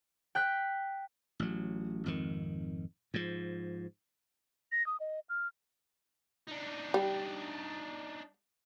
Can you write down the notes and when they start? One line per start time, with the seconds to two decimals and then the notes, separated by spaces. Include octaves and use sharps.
0.35 G5 F#6 B6
1.40 A1 F#3
2.06 G#1 F2 D#3
3.14 G#2 F3
4.72 A#6
4.86 D#6
5.00 D#5
5.29 F6
6.47 D4 D#4
6.94 G3